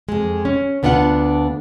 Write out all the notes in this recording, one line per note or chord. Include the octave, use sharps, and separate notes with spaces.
F2 G#3
C#4
D2 B3 D4 F4 F#5